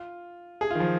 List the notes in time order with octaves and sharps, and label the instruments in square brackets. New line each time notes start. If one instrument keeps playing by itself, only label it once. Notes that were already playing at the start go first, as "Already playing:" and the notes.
Already playing: [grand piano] F4
G#4
D#3 F4
F3